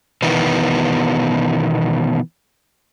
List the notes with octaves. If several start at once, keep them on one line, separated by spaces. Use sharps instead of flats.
B2 D#3 E3 B3